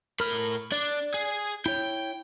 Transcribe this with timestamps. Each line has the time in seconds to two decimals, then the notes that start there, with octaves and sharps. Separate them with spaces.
0.20 A2 A#4 B5 F6
0.72 D4 D5
1.14 G#4
1.66 E4 C#5 G5